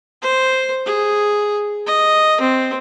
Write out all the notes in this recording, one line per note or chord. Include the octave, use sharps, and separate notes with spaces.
C5
G#4
D#5
C4